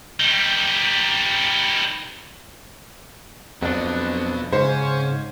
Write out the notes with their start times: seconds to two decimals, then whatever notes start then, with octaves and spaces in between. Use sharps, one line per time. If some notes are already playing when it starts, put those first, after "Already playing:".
0.20 D#3 G3
3.63 F2 F#3 B3 D4
4.53 G#2 C#3 C#4 C5